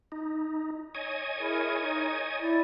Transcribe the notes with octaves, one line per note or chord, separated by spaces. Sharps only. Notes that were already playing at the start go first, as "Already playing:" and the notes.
D#4
C#5 D#5 G#5
E4 G#4 A#4
D#4
E4 D5